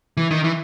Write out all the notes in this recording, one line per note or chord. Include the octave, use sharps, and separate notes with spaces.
E3
D#3
E3